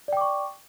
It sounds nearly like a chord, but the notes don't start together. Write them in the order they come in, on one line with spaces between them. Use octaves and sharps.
D5 G5 D6 C#6